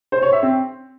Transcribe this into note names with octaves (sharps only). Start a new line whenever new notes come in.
C5
C#5
E5
C4